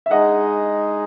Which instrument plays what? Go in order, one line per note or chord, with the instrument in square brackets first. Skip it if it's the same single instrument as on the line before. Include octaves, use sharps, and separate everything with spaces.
[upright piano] E5
[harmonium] G#3 D#4 G#4 [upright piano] D#5 F#5